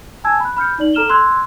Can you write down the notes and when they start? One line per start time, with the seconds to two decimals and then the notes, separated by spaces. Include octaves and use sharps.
0.24 G#5 A5 E6 G#6
0.40 B5 F#6
0.57 B5 F6 G6 C#7
0.78 D#4 D5 F#7
0.93 A4 A#5 F6 E7 F7 G7
1.10 C6 E6 F#6 G#6